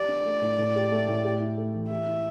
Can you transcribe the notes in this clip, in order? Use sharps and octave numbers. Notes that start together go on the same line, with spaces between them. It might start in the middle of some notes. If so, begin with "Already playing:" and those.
Already playing: G4 D5
D4
A3
A2
A2
G4
A3
A2
G4
E4
A3
E3
G4 E5
E4